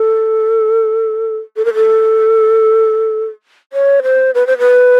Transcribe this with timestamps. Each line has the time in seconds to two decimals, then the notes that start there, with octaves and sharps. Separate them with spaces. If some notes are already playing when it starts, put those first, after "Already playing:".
Already playing: A4
1.56 A4
1.65 A#4
1.74 A4
3.73 C#5
4.03 C5
4.35 B4
4.47 C5
4.59 B4